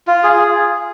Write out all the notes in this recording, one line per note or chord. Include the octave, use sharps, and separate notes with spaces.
F4
G#4